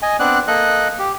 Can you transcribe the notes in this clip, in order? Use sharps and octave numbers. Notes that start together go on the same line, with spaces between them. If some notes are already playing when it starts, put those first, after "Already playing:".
D#5 G#5
B3 C4 D4 D5 F#6
A#3 A4 D#5 F#6
G4